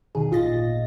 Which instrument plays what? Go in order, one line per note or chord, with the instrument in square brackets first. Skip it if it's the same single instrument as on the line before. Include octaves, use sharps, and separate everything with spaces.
[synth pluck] E2 B2 D#3 G#4
G#1 A#2 F4 D#5 A6 A#6